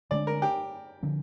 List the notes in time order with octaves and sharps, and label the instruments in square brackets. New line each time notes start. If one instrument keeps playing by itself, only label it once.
[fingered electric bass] D3 G#3 D4 [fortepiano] D5
[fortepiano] A#4
G4
[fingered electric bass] D3 F3 C4